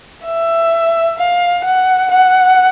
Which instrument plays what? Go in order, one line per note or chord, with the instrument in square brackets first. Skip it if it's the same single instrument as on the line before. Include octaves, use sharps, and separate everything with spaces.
[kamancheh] E5
F5
F#5
F#5